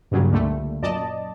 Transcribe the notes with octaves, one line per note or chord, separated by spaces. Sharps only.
G2 A#2 C#3 F#3 G3
C#2 A#2 D3 G3 A3
F#2 A#2 D5 D#5 A5